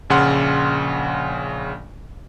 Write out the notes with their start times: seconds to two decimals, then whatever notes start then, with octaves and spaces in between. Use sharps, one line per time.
0.10 A#1 C#3 F#5 C6 F6